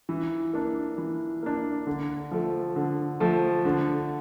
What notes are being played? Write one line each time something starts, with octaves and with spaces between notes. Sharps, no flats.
E3
A#3 D4
E3
A#3 D4
D3
F3 A3
D3
F3 A3
D3